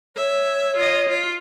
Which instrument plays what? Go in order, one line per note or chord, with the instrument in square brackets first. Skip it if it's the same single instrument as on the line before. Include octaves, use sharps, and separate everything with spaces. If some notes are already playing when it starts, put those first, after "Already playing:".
[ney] C#5 [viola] E5
[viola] F4 D#5
F4